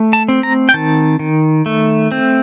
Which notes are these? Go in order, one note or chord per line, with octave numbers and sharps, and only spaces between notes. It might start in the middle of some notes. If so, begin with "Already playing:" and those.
Already playing: A3
A5
C4
A#5
G5
D#3 A5
D#3
A3
C4